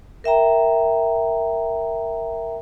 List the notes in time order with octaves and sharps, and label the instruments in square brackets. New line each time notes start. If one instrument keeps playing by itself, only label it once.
[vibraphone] A#4 E5 G5 A#5